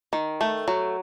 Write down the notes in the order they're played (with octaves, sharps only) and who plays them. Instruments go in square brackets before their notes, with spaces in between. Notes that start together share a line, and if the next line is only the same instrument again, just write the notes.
[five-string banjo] D#3
A3
F#3